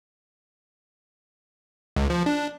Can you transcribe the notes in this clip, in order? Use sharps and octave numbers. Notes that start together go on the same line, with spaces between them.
C#2
F3
D4